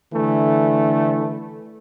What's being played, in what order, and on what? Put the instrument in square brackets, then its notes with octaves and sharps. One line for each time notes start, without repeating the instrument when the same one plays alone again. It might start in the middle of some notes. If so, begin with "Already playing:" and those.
[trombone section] D3 E3 A3